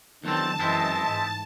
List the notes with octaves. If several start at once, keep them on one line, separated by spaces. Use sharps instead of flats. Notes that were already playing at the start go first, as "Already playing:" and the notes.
E2 D3 D#3 F#3 C4 A5
F#2 E3 G#3 C4 E4 D#5
G#2